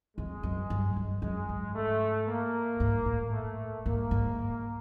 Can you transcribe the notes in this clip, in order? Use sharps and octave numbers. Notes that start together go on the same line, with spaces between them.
F2 G#3
F#2
G2
F#2
F#2 G#3
G#2
A3
A#3
G#2
A2
A3
G#2 A#3
G#2